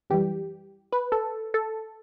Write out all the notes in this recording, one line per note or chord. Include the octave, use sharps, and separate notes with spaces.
F#2 E3 G3 G4
B4
A4
A4